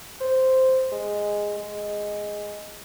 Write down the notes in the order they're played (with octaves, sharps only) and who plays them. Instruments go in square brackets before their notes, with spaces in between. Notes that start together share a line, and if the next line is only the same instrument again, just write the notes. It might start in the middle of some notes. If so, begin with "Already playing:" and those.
[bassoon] C5
G#3
G#3